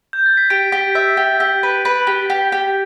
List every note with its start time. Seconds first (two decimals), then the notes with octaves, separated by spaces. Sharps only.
0.13 G6
0.26 A6
0.37 B6
0.50 G4 D7
0.72 G4
0.95 E5
1.17 G4
1.40 G4
1.63 B4
1.85 B4
2.07 G4
2.30 G4
2.52 G4